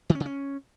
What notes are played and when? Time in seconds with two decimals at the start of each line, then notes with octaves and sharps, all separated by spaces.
0.10 D#3
0.15 C#4
0.20 C#3
0.26 C#4